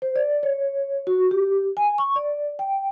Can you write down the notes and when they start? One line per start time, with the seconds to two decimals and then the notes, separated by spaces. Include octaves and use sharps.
0.02 C5
0.16 D5
0.43 C#5
1.07 F#4
1.31 G4
1.77 G#5
1.98 C#6
2.16 D5
2.59 G5